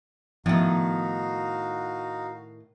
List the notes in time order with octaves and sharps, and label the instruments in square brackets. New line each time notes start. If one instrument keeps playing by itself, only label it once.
[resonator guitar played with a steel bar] A2 D#3 [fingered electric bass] F3 B3 [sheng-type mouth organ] D#4 F#4 F5